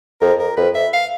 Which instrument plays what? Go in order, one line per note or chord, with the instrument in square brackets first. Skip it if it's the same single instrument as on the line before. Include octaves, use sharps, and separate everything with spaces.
[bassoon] F2 [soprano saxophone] A#4
[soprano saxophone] A#4
[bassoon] F2 [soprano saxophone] B4
[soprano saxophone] E5
F5